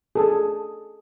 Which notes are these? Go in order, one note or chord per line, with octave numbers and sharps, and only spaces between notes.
G#4 A4